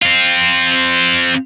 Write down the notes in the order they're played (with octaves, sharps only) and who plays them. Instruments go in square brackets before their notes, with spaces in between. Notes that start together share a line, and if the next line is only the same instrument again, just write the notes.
[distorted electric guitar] C4 F4